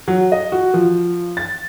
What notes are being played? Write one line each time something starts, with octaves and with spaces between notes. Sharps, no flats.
F#3
D#5
F#4
F3
A6